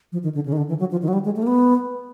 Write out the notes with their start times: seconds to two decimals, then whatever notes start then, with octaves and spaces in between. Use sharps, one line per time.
0.12 F3
0.23 D#3
0.34 D3
0.46 C#3
0.52 D#3
0.57 D3
0.68 E3
0.79 F#3
0.91 F3
1.02 D#3
1.08 F#3
1.13 G3
1.25 G#3
1.36 A3
1.42 A#3
1.47 B3